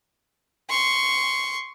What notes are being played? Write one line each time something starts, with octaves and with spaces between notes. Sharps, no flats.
C6 C#6